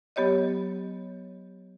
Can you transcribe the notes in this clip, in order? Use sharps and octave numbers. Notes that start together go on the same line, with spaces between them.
F#3 B3 G4 C#5 D#5